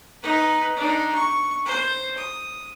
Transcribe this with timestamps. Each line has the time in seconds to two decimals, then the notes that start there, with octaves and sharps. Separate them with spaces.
0.23 D#4 B4
0.77 D4 D#4
1.14 C#6
1.65 C5
2.17 D#6